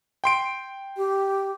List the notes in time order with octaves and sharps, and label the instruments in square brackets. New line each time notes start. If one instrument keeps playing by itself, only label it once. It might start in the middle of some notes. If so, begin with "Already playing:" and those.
[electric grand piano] G5 C6 D7
[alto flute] G4